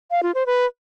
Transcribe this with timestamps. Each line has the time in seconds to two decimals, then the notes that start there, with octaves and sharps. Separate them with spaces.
0.11 F5
0.23 F4
0.35 C5
0.46 B4